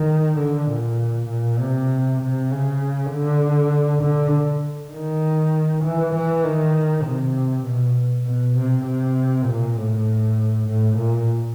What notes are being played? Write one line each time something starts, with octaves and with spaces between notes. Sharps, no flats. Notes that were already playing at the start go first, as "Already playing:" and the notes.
Already playing: D#3
D3
A#2
A#2
C3
C3
C#3
D3
D3
D#3
E3
E3
D#3
C3
B2
B2
C3
C3
A#2
A2
A2
A#2